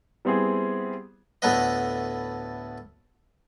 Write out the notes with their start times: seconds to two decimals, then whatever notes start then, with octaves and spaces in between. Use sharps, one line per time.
0.25 G3 B3 C4 E4 G#4
1.42 D2 A2 A3 B3 B4 D#5